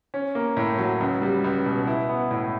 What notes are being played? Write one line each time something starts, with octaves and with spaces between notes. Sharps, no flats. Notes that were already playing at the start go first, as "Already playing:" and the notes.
C#4
A#3
A2
F#3
C#2
G3
C#2
B2
E4
B3
A2